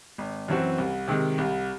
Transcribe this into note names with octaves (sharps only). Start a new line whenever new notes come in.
G#1
F#2 E3 C4 F#4
C2
C3 D#3 G#3
C2